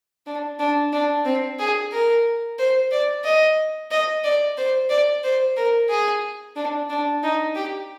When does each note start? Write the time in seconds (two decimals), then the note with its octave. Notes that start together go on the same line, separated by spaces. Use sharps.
0.26 D4
0.59 D4
0.93 D4
1.25 C4
1.59 G#4
1.92 A#4
2.59 C5
2.91 D5
3.25 D#5
3.91 D#5
4.24 D5
4.57 C5
4.90 D5
5.24 C5
5.57 A#4
5.89 G#4
6.56 D4
6.90 D4
7.23 D#4
7.55 G4